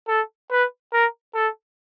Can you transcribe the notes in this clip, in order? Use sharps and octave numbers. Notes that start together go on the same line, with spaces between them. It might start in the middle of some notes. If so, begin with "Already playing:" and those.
A4
B4
A#4
A4